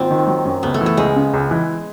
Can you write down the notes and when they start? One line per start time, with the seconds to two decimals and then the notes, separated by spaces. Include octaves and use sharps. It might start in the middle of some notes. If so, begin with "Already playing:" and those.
Already playing: G#1 A#3 C4 F4
0.11 D#3
0.27 F#3
0.45 F#2
0.63 C#2 B3
0.74 A3
0.81 E3
0.86 A3
0.97 C#2 G#3
1.16 C#3
1.33 C#2
1.51 E3